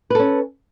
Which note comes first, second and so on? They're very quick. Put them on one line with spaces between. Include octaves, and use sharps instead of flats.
B4 A4 C#4